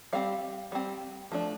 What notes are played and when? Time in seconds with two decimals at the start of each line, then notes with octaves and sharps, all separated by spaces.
0.13 G3 C4 F5
0.72 G3 C4
1.32 F3 A3 D4